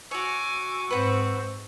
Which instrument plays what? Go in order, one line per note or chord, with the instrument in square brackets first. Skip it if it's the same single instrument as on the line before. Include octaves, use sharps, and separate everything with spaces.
[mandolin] F#4 C#5 [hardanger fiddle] G#5 D6 [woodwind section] C#6 E6
[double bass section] G#2 [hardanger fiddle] C4 [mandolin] B4 F#5